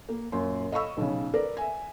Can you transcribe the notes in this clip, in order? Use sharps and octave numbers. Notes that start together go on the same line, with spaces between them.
A#3
F#2 A#2 C6
D#5 F5 B5 C#6 E6
B1 C#3
A#4 B4 D5
E5 G#5